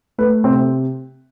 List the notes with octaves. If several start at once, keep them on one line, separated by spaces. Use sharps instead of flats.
A3 B4
C3 C4 C5